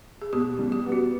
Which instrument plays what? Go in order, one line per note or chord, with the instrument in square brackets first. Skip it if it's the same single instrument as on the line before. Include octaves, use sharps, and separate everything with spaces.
[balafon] G#4
[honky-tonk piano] B2 [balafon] G4
[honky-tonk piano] G3
[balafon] G4
[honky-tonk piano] B3
[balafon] F#4